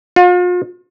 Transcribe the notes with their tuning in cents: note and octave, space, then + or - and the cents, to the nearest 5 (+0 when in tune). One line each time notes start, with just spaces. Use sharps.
F4 +40